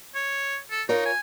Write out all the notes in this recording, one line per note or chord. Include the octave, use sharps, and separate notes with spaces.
C#5
A4
D#4 F4 A#4 C#5
G#5